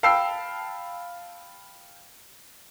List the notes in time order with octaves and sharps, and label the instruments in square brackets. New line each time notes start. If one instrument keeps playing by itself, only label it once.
[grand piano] F5 G5 A5 B5 E6 C7